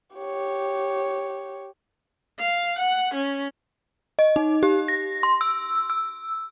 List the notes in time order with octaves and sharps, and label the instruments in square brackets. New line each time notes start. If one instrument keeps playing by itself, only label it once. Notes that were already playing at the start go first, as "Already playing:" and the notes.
[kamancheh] G4 C#5
[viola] F5
F#5
C#4
[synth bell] D#5
D#4
G4
A#6
C6
E6
E6